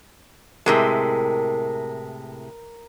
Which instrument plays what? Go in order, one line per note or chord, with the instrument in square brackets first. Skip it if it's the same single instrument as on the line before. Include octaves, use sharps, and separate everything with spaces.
[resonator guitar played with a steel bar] A2 C3 G#3 [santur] A#4 B4